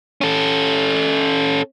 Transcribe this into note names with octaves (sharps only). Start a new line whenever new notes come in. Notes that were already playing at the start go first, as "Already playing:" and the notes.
C#4 A4